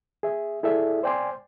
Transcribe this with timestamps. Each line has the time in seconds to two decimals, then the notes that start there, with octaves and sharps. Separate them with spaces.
0.23 G#4 E5
0.63 E4 G#4 A4 D5 E5
1.03 C5 D5 G5 G#5 C6 D6